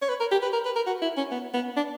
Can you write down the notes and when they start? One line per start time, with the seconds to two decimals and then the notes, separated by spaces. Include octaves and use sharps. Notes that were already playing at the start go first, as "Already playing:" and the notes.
0.02 C#5
0.09 B4
0.20 A#4
0.32 G4
0.43 B4
0.53 A#4
0.65 B4
0.76 A#4
0.87 F#4
1.02 E4
1.17 C#4
1.31 B3
1.54 B3
1.76 D4